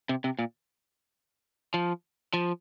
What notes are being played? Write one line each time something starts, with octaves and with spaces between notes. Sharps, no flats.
C3
C3
A#2
F3
F3